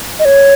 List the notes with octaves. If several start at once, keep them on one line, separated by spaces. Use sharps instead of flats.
D#5
C#5